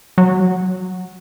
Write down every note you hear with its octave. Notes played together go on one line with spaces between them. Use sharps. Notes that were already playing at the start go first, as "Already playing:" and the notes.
F#3